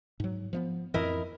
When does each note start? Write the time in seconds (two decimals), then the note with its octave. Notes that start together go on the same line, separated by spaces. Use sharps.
0.20 G#2 F#3
0.53 F3 A3 B3
0.94 F2 A2 E3 E4 A#4 D#5